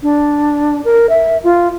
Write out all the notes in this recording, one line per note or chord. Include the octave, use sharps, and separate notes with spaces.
D4
A#4
E5
F4